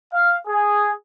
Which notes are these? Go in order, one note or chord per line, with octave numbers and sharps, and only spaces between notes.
F5
G#4